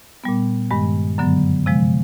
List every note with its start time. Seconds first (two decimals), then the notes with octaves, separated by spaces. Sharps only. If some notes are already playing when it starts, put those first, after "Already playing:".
0.24 A#2 G3 B3
0.71 G2 D#3 G#3
1.18 F#2 D3 F#3 B3
1.66 C3 F3 G#3